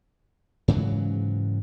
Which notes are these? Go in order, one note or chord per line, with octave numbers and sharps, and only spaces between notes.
G#2 C#3 E3 F#3